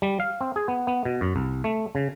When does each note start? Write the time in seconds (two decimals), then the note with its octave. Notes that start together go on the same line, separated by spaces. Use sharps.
0.02 G3
0.20 F5
0.41 C4
0.56 G#4
0.68 B3
0.87 B3
1.05 B2
1.21 F#2
1.36 C2
1.64 A3
1.95 C#3